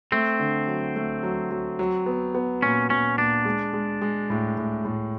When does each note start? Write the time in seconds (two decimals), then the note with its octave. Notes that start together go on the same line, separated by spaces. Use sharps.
0.12 A3 C4
0.39 D3
0.67 F#3
0.96 A3
1.23 F#3
1.51 F#3
1.79 F#3
2.06 B3
2.35 B3
2.62 A#2 C#4
2.90 A#2 C#4
3.18 A#2 D4
3.45 G#3
3.74 G#3
4.02 G#3
4.30 A2
4.57 A2
4.85 A2